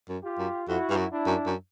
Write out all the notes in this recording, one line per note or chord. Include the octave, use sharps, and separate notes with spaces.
F#2
F4 G4
F#2
F2 E4 F#4
G2
F#2
D4 E4
F#2
F#2